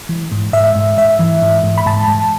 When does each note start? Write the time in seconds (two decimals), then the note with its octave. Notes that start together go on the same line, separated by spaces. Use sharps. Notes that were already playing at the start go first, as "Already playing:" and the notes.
0.09 E3
0.32 G#2
0.53 G#2 E5
0.76 G#2
0.98 G#2 E5
1.19 E3
1.42 G#2
1.64 G#2
1.78 B5
1.86 G#2 A5
2.08 G#2